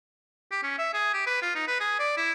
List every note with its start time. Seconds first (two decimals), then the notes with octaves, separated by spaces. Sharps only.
0.51 G4
0.63 C#4
0.79 E5
0.93 G#4
1.14 G4
1.27 B4
1.42 F4
1.55 D#4
1.67 B4
1.80 G#4
1.99 D5
2.17 E4